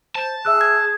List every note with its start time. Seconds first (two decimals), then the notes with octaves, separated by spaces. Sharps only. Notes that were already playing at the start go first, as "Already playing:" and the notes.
0.15 C5 A5
0.45 G#4 E5 E6 F#6
0.61 G#6